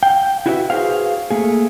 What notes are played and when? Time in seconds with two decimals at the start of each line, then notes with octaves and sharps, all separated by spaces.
0.03 F5 G5
0.46 E4 F#4 G4 B4 D5 E5
0.70 F#4 G#4 B4 C5 F5
1.31 A3 A#3 G#4